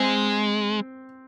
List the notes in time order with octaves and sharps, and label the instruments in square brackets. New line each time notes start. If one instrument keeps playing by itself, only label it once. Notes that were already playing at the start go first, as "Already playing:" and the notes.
Already playing: [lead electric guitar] G#3 [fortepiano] C4